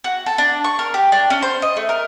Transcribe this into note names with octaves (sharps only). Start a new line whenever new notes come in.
F#4
A4
D4
C#6
A#4
G4
D4
C#4
C5
D#5
A3
A#4